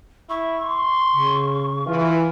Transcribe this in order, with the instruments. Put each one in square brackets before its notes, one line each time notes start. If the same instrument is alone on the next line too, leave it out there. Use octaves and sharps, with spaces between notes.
[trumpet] E4 [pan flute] C#6
[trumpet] C6
[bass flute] C#3
[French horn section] E3 [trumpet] F4